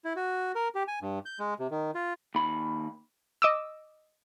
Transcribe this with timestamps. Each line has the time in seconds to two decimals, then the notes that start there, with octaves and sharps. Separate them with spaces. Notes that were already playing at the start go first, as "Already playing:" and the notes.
0.05 E4
0.16 F#4
0.55 A#4
0.75 G4
0.88 G#5
1.02 G2
1.25 G6
1.39 G#3
1.59 C3
1.71 D#3
1.95 F4
2.35 D#2 B5
3.42 D#5 D6 E6